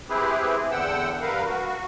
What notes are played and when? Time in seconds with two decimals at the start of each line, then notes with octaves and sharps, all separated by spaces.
0.09 C4 E4 G4 G#4 B4
0.71 E2 D3 F#5 G5 E6
1.21 G2 A#4 B4 F5
1.46 F#4